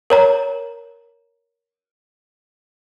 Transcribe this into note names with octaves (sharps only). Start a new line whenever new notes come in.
A#4 C#5 A#5